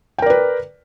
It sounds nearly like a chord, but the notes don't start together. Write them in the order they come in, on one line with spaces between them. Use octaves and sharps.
G5 A#4 D5 B4